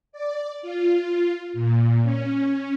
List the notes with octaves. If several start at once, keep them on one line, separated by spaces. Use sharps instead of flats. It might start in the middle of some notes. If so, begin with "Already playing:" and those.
D5
F4
A#2
C#4